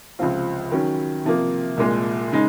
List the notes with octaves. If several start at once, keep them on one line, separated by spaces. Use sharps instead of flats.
C#2 C3 F3 C4 F4
D#3 F#3 C#4
C3 F3 A#3
C2 A#2 G#3
C#3 G#3 D#4